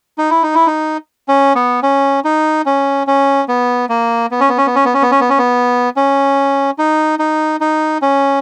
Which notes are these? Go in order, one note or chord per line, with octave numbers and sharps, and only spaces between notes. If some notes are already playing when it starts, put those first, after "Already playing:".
D#4
E4
D#4
E4
D#4
C#4
B3
C#4
D#4
C#4
C#4
B3
A#3
B3
C#4
B3
C#4
B3
C#4
B3
C#4
B3
C#4
B3
C#4
B3
C#4
D#4
D#4
D#4
C#4